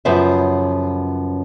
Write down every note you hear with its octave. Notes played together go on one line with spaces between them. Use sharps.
F#2 C#3 F3 B3 B4 E5